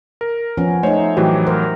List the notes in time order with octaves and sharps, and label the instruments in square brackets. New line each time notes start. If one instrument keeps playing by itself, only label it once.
[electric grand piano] A#4
[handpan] F3 B3 C#4
[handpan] A3 D#4 [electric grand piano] C5 C#5
[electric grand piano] A2 E3 F#3 [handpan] G4
[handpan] A#4 C5